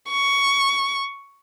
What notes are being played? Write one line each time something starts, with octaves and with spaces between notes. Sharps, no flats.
C#6